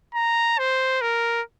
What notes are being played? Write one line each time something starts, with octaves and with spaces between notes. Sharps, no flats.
A#5
C5
A#4